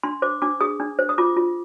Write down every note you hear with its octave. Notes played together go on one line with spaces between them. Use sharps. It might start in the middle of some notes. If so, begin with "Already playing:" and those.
D4 C6
C5 D6
D4 D6
G#4 D#6
D4
C5
D#6
F4 D6
F4